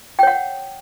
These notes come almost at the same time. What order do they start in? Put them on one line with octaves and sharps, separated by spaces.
G5 C#5 F#5